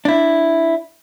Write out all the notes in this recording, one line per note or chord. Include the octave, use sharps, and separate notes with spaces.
D4 E4